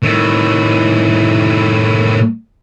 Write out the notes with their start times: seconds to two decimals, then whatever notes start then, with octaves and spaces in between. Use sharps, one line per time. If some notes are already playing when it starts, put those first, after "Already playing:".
0.03 A2 D#3